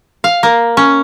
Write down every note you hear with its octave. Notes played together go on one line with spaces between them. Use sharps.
F5
A#3
C#4